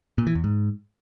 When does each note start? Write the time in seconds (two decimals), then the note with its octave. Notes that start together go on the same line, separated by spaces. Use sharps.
0.18 A#2
0.27 E3
0.35 E2
0.44 G#2